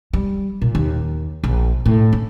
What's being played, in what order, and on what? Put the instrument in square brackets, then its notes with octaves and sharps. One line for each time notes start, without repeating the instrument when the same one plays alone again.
[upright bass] G3
A#2
D#2
A#1
A2
C#4